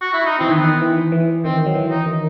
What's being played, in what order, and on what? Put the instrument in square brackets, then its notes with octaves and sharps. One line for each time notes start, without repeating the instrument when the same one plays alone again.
[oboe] F#4
E4
D#4
[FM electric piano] E3 [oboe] C4
[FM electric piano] D#3 [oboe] B3
[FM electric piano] E3
E3
[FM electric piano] D#3 [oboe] C4
[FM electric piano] F#3
E3
[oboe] D#4
[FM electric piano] D#3